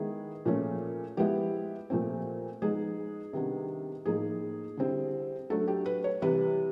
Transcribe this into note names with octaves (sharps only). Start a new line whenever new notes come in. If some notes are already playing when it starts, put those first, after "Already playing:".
Already playing: D#3 G#3 B3 E4 G#4
A#2 F3 A3 C#4
F3 G#3 B3 E4 G4
A#2 F3 A3 C4
F3 G#3 B3 D#4 G#4
C3 D#3 G3 B3 D4
A2 F3 A#3 D#4 G#4
D3 G3 C4 E4
F#3 A3 D4 A4
G4
B4
C#5
C3 E3 G3 B4